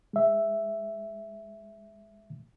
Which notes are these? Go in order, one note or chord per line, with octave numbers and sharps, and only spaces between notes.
G#3 E5